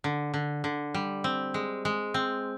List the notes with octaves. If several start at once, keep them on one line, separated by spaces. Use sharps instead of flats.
D3
D3
D3
G3
C4
G#3
G#3
C4